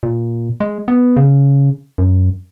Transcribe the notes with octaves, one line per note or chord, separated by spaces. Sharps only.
A#2
G#3
B3
C#3
F#2